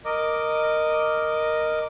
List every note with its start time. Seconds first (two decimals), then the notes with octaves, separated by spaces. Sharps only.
0.05 A#4 D#5 D6